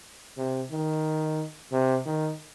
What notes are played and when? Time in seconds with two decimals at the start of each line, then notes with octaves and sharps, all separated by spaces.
0.38 C3
0.71 D#3
1.72 C3
2.06 D#3